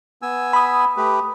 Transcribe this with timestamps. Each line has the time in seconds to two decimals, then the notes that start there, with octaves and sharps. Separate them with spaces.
0.22 B3 G#5 E6
0.53 B5 D#6
0.97 A3 G4 B4